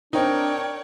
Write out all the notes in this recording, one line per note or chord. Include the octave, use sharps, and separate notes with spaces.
C4 D4 D#4 A#4 C#5 D5 G5